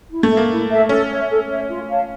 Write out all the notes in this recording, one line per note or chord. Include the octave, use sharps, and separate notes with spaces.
E4
A3
A4 E5 A5
A#3
E4
A4 E5 A5
C#4 A4
C#5 E5
A4
C#5 E5
F4
C#5 F5 A5